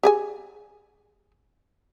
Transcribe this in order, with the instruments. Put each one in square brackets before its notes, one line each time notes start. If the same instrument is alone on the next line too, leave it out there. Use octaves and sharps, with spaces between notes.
[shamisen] G4 G#4 G#5